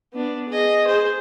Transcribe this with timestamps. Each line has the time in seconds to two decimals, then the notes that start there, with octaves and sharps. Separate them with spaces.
0.13 B3 D4
0.49 G#4 D#5
0.86 G#4 C5